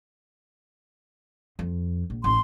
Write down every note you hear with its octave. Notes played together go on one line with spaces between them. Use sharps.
F2
A#1
A1 D#4 C6